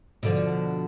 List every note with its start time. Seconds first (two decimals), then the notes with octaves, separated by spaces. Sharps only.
0.23 B2 D3 F3